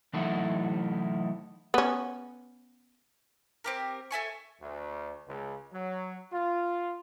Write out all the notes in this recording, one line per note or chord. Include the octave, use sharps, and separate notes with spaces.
E3 F#3 A3 D#4 E4 F#4
B3 C#4
C4 G4 A#4
A4 E5 G#5 C#6
D2
C#2
F#3
F4